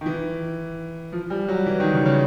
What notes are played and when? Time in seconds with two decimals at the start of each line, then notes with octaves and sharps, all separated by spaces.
0.01 D#3
0.06 E3
1.12 F3
1.30 G3
1.48 F#3
1.66 E3
1.80 D#3
1.93 C#3
2.06 C#3